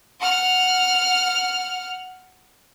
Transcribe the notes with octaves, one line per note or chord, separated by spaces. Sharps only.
F#5 F6